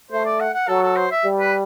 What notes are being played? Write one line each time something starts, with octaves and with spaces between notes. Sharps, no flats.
A3 C5
D5
F#5
F#5
F#3 A4
A4
C5
E5
G3
B4